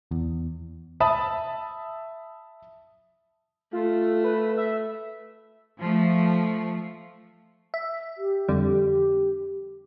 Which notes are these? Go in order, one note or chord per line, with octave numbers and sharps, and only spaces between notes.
E2
E5 A5 B5 D#6
A3 F4
B4
E5
F3 A3
E5
G4
F2 D3 G3